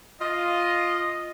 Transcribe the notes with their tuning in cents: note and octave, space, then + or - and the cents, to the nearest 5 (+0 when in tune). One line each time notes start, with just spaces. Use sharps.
F4 +0 D#5 +0